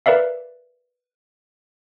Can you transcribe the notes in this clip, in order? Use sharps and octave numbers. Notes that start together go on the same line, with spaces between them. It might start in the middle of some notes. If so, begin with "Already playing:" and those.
A#4 B4 D5 E5 F5